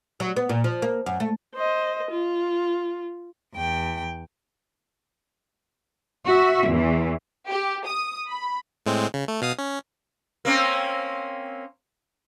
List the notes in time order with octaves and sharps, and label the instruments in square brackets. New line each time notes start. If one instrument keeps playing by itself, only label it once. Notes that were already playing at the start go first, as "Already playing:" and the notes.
[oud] F#3
B3
A#2
F3
A#3
F#2
A3
[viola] C5 D#5
F4
[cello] E2 G5
[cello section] F#4 E5
E2 E3
[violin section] G4
D#6
B5
[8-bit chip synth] A2 G#3 C4
C#3
A3
B2 F5 D#6
C#4
[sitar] A#3 C4 C#4